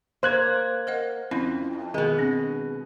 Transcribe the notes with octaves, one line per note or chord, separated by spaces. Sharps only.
A#3 C5 F#6 G#6
A#4 D#5 F#5
F2 C4 C#4 E4
B2 D#3 G#3
C4 D4